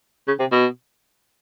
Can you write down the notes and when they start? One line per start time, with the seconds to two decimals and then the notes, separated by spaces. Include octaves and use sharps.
0.27 C#3
0.40 C3
0.52 B2